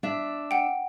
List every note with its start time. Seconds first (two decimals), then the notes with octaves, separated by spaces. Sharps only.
0.03 D4 E5
0.51 F#5 G5